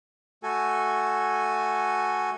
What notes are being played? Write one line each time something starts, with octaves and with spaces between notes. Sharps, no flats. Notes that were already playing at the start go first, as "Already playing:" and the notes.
A3 F#4 A4 G#5